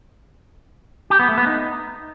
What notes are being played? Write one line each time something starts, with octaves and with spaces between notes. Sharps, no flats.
G4
B3
A3
B3
D#4